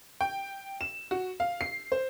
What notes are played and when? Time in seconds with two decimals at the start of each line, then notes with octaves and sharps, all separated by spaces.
0.21 G5
0.81 E7
1.11 F#4
1.40 F5
1.61 C7
1.92 C5